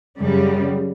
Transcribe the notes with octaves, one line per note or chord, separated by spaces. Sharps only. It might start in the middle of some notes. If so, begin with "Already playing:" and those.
F#2 C#3 G3